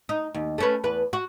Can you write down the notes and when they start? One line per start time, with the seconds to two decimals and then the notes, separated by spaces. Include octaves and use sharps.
0.09 D#4
0.34 D#2
0.58 A3 C#4 B4
0.84 E2 B4
1.13 F#4